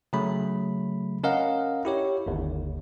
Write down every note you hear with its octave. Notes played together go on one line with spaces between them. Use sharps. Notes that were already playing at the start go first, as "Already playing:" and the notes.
C#3 F#3 A3 B5
C#4 A#4 D#5 F5 F#5
E4 G4 C#5
G1 D#2